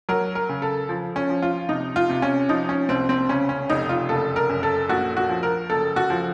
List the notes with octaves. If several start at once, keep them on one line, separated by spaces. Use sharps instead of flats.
F#3 A#4
A#4
C#3
A4
F3
C#4
F3
F4
C3 D#4
F4
C3
C#4
F3 D#4
C#4
C2 C4
C4
C#3 C#4
C#4
F1 D#4
F4
F#1 A4
A#4
F#2
A4
A#1 F#4
F#4
F3
A#4
F#1 A4
F#4
F3